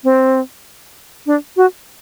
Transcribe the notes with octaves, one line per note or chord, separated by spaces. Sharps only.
C4
D4
F#4